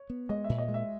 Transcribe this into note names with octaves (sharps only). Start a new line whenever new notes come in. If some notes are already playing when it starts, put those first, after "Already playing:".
Already playing: C#5
B3
G#3 D#5
A#2 E5
D#5
G#3
E5